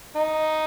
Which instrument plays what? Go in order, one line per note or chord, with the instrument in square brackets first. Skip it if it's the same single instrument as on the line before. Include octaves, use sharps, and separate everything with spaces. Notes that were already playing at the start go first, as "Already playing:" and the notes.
[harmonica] D#4